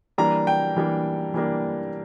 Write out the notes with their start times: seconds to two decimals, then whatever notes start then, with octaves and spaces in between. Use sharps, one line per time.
0.18 E3 G3 A#3 D4 A#5
0.47 G5
0.76 E3 G3 A#3 D4
1.34 E3 G3 A#3 D4